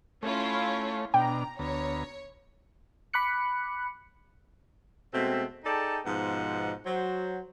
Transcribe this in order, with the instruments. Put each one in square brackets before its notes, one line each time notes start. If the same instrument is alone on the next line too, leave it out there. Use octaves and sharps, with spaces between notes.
[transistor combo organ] A3 C#5 [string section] C#4 E4 F4
[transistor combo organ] B2 D4 [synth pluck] G5 [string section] A#5
[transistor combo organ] D2 B3 A#5 [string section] C#5
[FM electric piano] B5 D6 F#6 C#7
[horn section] B2 G#3 A3 C4
D#4 G#4 A4 D5 G5 A5
G#2 B2 F3 B3 D#4 F#5
F#3 C5